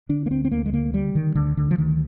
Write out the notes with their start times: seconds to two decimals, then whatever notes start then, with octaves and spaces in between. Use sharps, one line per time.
0.09 D3 D4
0.26 A#3
0.30 D2 C4
0.45 C4
0.51 D2 A#3
0.66 G#3
0.73 D3 A#3
0.94 D3 G3
1.15 D3 D#3
1.35 D2 D3
1.57 D2 D3
1.71 F3
1.78 D2 D#3